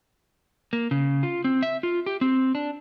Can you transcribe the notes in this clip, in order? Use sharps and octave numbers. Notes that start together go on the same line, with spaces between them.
A#3
C#3
F4
C4
E5
F4
G4
C4
D4